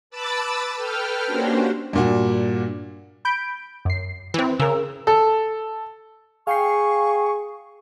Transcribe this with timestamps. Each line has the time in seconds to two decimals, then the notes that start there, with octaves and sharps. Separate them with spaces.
0.10 B4 A5 B5 D6 E6 A6
0.76 A4 B4 G5 F6
1.26 A#3 C#4 D4 F#4 G4 C5
1.93 G2 A#2 F#4
3.25 B5 G6 D7
3.85 F#2 C7
4.34 E3 C4
4.60 C#3 A#4 E6
5.07 A4
6.47 G#4 F5 G5 C#6 C7